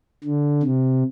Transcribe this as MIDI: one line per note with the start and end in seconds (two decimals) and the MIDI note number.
0.24 0.62 50
0.63 1.04 48